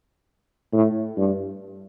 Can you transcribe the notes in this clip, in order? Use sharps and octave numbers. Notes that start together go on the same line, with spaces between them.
A2
G2